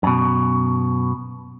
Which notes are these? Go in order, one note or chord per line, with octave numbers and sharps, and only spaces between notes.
F#2 B2